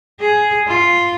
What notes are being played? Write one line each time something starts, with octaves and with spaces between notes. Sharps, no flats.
G#4
F4